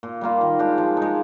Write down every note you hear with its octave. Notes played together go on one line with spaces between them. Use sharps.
A#2
G3 A#3 F4
D#3
G#3 D4 G4
F3
G#3 D#4